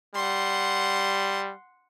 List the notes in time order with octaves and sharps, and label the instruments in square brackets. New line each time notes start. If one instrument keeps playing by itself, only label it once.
[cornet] G3 [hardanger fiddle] F#5 C6